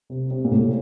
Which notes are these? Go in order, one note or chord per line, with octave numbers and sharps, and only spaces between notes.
C3
C3
A#2
A2